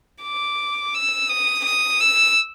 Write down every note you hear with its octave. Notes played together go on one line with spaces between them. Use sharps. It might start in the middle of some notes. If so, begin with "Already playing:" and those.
D6
E6
D#6
D#6
E6